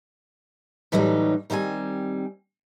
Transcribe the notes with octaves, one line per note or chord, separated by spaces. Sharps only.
A2 E3 F#3 G3 B3 D#4
D#3 G3 C4 F5 G#5